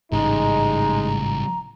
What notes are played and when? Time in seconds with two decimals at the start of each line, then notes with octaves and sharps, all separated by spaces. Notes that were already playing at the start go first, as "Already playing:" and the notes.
0.12 A1 G#2 C#3 G3 G#3 D#4 A#5